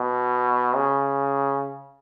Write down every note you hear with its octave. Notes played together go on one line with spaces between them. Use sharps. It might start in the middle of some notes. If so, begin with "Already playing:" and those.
Already playing: B2
C#3